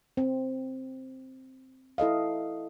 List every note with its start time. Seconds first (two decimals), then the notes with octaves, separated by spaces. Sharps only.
0.17 C4
1.98 E4 A4 D#5 F5